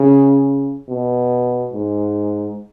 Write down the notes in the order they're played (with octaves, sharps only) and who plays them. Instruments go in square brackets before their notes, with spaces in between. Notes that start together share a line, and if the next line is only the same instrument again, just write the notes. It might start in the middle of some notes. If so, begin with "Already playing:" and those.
Already playing: [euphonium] C#3
B2
G#2